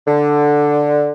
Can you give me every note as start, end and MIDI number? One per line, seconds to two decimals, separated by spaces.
0.08 1.11 50